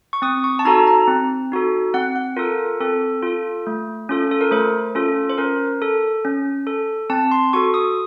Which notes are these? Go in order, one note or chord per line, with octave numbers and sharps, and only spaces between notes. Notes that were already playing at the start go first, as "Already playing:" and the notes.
C#6
C4 D#6
C#6
A5
D#4 F#4 A4 A#5
A#5
C4
D#4 F#4 A4
C4 F#5
F#5
F4 A4 A#4
C4 A4
F4 A4
A3
C#4 F4 A4
A4
A#4
A3 C5
C#4 F4 A4
C5
C#4 A#4
A4
C#4
A4
C4 A5
C6
F#4 A4 C#6
D#6